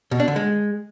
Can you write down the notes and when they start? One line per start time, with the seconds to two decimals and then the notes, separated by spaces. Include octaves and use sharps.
0.11 B2
0.20 D4
0.28 D3
0.36 G#3